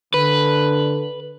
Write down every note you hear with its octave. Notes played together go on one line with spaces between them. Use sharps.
D3 B4